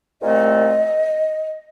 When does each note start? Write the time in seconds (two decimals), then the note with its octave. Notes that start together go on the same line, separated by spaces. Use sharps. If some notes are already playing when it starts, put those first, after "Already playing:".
0.22 C2 A#2 A3 C4 D#5